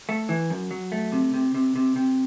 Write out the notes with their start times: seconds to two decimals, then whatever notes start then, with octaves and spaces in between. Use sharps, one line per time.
0.09 A3
0.29 E3
0.50 F#2
0.71 F#3
0.92 A3
1.12 C3
1.34 C3
1.54 C3
1.76 C3
1.96 C3